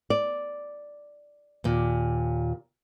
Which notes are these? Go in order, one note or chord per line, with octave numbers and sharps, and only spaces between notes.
D5
D#2 A#2